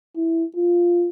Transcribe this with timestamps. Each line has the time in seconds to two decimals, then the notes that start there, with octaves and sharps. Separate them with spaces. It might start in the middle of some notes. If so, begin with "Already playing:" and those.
0.17 E4
0.56 F4